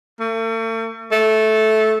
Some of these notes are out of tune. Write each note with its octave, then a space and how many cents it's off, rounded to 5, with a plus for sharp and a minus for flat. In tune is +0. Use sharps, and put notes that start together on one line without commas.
A3 +45
A3 -10